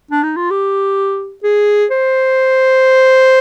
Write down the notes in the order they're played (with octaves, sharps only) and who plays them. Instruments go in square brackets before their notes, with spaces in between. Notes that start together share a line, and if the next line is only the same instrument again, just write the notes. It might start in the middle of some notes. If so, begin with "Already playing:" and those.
[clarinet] D4
D#4
F4
G4
G#4
C5